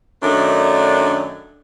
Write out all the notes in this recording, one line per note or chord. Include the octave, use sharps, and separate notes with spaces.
F#2 D#3 A3 D4